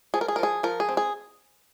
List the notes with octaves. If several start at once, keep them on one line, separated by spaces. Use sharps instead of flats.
F3 G#4
A#4
G#4
A#4
F3 G#4
F3 A#4
G#4
C4
G#4